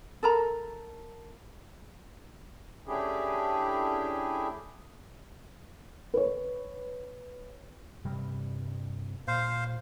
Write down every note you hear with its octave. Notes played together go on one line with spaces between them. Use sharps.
A4 A#4 A#5
A3 C#4 D4 E4 G4 G#4
B4 C#5
G2 C3 G3
A#2 C5 F5